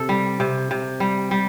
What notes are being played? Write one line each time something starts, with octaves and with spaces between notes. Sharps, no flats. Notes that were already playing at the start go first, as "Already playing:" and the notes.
Already playing: C3 A4
G3
C3
C3
G3
G3